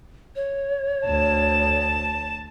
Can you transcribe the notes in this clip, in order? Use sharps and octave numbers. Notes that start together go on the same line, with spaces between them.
C#5
D2 A5 E7